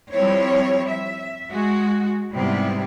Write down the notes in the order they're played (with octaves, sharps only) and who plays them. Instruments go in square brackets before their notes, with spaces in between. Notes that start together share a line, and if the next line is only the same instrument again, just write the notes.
[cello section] F3 G3 C4 E4 C#5
E5
G#3 F#4
G#2 C3 G3 B3 C4 E4